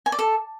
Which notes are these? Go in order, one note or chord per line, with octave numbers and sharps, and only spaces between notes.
G#5
D5
A4